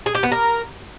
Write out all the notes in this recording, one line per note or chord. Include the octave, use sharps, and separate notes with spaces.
G#4
G4
B3
A#4